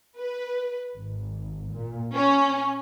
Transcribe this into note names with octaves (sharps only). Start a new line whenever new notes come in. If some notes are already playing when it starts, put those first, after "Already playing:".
B4
G#1
A#2
C#4